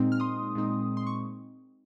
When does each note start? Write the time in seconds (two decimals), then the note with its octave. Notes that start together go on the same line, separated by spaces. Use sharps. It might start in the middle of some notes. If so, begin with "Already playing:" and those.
Already playing: A#2 G#3 C4 D#4
0.12 F6
0.20 C6 D#6
0.55 A#2 G#3 C4 D#4
0.97 C6
1.07 C#6